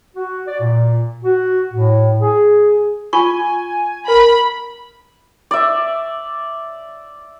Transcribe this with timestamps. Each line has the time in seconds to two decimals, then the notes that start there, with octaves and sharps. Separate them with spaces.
0.15 F#4
0.47 D5
0.60 A#2
1.24 F#4
1.73 A2
2.21 G#4
3.13 F4 G#5 C#6
4.08 A#4 B5
5.51 D5 E5